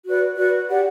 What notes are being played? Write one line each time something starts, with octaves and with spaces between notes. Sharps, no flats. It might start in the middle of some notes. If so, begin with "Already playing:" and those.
F#4 B4 D5
F#4 B4 D5
G4 D5 F#5